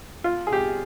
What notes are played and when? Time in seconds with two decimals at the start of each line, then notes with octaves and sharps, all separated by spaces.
0.24 F4
0.47 G#4
0.53 G4